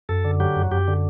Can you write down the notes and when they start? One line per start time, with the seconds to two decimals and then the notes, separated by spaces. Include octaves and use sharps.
0.09 F#2 A4
0.25 D3
0.40 F#3 G4
0.56 F#2
0.71 F#2 G4
0.88 D3